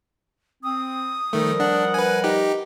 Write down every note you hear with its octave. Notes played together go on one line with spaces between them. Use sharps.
C4 D#6
D#3 F3 G3 A3 A#4
D4 F#5
B4 G#5
D#4 G4